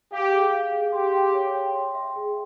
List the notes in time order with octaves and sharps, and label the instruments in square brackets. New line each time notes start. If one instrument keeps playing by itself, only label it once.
[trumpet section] G4 [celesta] F5
[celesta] G#4
F5
G#4
[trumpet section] G4 [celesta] C6
[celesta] G5
C#5
G5
C6
E5
G#4